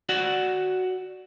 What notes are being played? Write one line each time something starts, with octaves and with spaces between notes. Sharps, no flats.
F#4 D5 F#5